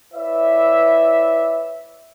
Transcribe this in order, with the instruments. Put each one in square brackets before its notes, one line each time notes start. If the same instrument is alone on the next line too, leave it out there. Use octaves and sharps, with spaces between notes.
[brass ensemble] E4 B4 C#5 D5 E5